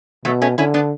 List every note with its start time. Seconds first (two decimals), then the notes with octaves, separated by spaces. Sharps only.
0.25 B2 F#3 A3
0.42 A3 C#4
0.58 D3 C#4 E4
0.74 B3 D4